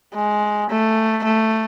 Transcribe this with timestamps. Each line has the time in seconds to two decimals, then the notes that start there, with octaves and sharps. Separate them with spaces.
0.15 G#3
0.70 A3
1.24 A3